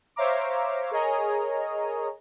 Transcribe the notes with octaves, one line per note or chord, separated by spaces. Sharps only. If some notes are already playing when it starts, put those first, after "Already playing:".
C5 C#5 E5 F5 A#5 D6
G#4 A#4 C#5 D#5 G#5 A#5